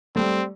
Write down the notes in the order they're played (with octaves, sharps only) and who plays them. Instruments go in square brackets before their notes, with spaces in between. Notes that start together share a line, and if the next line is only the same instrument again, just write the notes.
[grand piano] G3 A3 [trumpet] C4